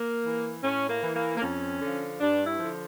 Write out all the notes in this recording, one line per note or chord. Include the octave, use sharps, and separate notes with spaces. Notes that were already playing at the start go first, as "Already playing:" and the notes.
Already playing: A#3
E3
A2 C#4
A#3
E3
A#3
A#3
F2 C#4
D3 F3
G2 D4
E4
D3 F3